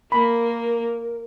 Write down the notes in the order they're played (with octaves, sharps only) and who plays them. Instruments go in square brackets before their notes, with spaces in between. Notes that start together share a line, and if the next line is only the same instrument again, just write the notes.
[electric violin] A#3 [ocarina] A#4 [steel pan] B5